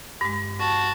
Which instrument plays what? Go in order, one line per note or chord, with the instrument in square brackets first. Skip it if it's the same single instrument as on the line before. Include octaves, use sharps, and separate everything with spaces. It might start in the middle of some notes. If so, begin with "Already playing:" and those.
[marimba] G2 G#3
[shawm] F#4 [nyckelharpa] A5